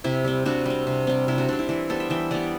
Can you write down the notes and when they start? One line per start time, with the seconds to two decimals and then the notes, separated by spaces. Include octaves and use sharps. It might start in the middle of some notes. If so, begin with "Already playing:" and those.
0.04 C3 E4 G4
0.25 G3 C4
0.45 C3 D4 F#4
0.66 G3 C4
0.87 C3
1.07 G3 C4
1.28 C3 E4
1.38 D4 F#4
1.49 G3 C4 D4
1.59 E4
1.69 E3 D4
1.89 G3 B3 A4 C5
2.00 E5 G5
2.10 E3 E5 G5
2.31 G3 B3 D5 F#5